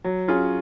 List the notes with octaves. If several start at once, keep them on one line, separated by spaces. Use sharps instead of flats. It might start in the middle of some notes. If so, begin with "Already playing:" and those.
F#3
C#4 F4 G#4